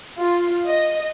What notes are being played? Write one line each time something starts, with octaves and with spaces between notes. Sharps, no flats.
F4
D#5